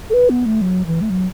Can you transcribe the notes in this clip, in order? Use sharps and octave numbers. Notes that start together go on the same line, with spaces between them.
A4
B4
B3
A3
F#3
E3
A3
F#3